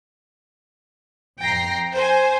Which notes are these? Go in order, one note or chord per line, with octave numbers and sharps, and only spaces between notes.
F2 G5 A#5 A#6 C7
C5 G#5